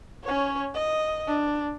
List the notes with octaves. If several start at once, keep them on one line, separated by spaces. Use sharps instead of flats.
C#4 C#5
D#5
D4